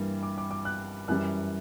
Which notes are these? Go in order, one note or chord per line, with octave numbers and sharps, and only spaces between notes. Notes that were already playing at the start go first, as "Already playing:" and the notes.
Already playing: G2 E3 G3 A#3
D6
D6
D6
F#6
F#2 E3 G3 F#6